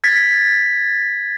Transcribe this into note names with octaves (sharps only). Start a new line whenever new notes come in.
G#6 A6 B6